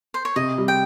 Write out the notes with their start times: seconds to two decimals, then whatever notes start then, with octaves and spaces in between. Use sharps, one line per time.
0.14 C5
0.25 C#5
0.36 C3 D#5
0.58 G3
0.68 G5